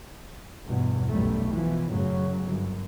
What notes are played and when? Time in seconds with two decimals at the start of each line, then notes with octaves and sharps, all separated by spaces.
0.67 E2 G2 B2
1.10 B1 F#2 G3 A3
1.51 B2 E3 F3
1.91 F#2 A2 C#3 F#3
2.43 G1 F#2